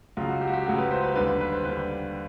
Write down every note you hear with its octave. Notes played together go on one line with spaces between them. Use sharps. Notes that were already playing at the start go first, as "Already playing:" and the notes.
C#2 C#3 F#3 F4
F#4
G4
F#4
G4
C#2 C#3 F#3 F#4
B4
C5
B4
D#2 D3 G3 B4
B4
B4
C5
D#2 D3 G3 B4